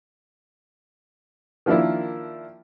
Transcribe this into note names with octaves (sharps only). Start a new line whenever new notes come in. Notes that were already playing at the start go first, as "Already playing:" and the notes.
D#3 F3 A#3 D4 E4